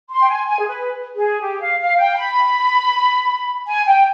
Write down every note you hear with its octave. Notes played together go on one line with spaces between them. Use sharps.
C6
G5
G#5
G#5
G#4
B4
G#4
G4
F5
F5
G5
B5
G#5
G5